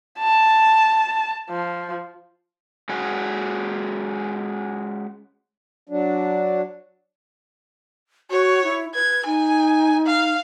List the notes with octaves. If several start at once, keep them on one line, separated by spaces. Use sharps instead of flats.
A5
F3
G#3 C#4 F#4 G#4
F#3 D4
F#4 C#5
E4
B4 G#6
D#4 G#5
F5